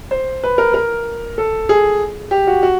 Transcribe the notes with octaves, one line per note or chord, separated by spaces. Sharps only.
C5
B4
A#4
A#4
A4
G#4
G4
F#4
F#4